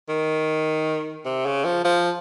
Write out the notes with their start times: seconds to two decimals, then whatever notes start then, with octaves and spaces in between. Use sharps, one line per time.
0.09 D#3
1.25 C3
1.46 C#3
1.65 F3
1.85 F3